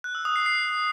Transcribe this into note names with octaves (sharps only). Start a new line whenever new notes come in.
F#6
E6
D#6
C7
C7